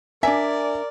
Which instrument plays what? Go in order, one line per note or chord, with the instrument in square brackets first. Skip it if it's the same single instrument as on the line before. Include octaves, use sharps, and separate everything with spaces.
[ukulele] D4 E5 [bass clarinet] A#4 [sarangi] D5 [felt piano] G#5